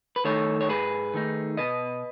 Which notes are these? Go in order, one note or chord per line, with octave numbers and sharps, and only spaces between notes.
B4
D#3 A3 D#4 A4 C#5
C#5
G#2 G#4 B4
D#3 A3 D#4
B2 B4 D#5